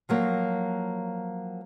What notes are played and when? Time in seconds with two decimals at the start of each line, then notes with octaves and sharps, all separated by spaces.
0.09 F3 F#3 A#3